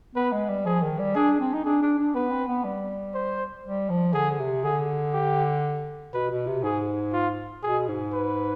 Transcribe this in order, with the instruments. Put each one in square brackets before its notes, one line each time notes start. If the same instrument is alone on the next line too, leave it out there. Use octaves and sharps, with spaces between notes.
[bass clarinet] B3 [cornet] B4
[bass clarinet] G#3
G3
[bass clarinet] F3 [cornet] G#4
[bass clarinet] D#3
G3
[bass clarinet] D4 [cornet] G#4
[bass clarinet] C4
D#4
[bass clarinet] D4 [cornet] G#4
[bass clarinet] D4
D4
[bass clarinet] B3 [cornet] B4
[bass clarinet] C4
B3
G3
[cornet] C5
[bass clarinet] G3
F3
[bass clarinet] D3 [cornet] G#4
[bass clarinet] C3
[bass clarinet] D3 [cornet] G#4
[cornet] G4
[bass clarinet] B2 [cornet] B4
[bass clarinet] B2
C3
[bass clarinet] G#2 [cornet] G#4
[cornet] F4
[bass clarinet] B2 [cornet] G#4
[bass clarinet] G#2
[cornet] B4